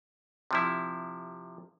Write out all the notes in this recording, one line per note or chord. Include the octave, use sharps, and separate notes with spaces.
C3 F3 E4